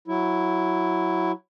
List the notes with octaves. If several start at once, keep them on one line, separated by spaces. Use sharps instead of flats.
F#3 E4